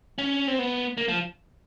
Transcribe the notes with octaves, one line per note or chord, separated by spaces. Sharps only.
C#4
C4
B3
A#3
F3